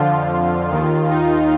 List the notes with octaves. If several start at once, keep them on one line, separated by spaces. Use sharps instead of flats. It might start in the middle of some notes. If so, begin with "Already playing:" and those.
Already playing: F2 D3 F3 F4
D#2 D#3
D#4